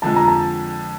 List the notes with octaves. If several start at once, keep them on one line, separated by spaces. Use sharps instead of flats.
F2 D3 F3 G#3 A5
A#5
A5